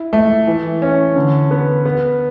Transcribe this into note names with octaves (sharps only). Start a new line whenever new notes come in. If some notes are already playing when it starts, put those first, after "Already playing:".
Already playing: E4
A3
E3
C#4
D3
B3
B3